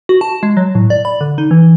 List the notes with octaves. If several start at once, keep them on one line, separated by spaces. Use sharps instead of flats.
F#4
A5
G#3
F#3
A2
D5
B5
D3
D#4
E3